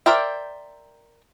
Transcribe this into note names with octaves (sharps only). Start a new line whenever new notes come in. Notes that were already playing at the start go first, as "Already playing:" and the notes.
A#4 C5 D5 E5 G5